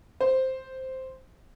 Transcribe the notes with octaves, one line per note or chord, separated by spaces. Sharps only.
C5